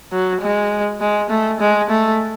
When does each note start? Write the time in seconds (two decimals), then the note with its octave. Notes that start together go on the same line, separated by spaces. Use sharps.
0.12 F#3
0.41 G#3
1.01 G#3
1.30 A3
1.61 G#3
1.90 A3